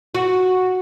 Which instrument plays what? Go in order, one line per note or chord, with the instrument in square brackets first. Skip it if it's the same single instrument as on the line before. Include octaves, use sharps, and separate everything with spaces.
[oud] F#4